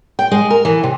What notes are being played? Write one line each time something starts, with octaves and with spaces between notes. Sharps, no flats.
G5
G#3
A#4
E3
C3